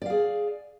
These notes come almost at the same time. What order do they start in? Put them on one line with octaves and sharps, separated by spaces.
D5 F5 G#4